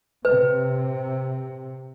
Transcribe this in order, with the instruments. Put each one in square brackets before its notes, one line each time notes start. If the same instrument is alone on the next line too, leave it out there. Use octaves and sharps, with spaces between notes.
[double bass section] C3 [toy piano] B4